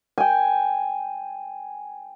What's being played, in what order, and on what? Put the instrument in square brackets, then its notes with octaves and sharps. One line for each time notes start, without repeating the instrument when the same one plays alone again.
[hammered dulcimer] G5 G#5